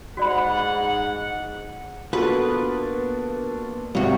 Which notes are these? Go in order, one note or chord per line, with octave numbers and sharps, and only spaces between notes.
G#2 F#4 D5 F#5 B5
A#3 B3 D4 F4 F#4 A4 B4
G#1 C3 F#4